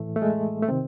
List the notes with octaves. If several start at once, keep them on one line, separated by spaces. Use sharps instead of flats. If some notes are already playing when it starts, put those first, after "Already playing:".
Already playing: A2 E3 A3
A3
G#3
A3
C3 D#3 C4